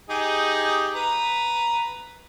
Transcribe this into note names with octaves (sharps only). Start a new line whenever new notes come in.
D#4 G4 G#4
B4 A#5